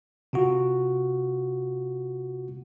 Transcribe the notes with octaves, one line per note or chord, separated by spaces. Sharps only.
C3 F4 F#4